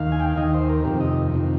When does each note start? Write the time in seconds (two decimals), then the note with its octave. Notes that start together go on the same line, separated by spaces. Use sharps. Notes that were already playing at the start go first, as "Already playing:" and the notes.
Already playing: D#2 D#3 F5
0.12 G#5
0.20 G5
0.29 F5
0.37 D#2 D#3 D#5
0.54 C5
0.69 A#4
0.85 F2 C3 D#3 G4
1.01 D#5
1.32 F2 C3 D#3